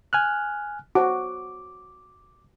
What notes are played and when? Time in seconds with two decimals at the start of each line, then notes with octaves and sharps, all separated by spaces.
0.13 G#5 F6 F#6
0.95 F#4 C5 D6